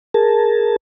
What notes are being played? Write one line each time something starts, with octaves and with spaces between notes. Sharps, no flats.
G#4 A#4 A5